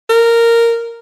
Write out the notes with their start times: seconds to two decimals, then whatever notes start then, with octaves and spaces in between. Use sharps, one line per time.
0.10 A#4